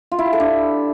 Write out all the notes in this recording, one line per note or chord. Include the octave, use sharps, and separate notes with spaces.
F4
E4
G4
A4
D4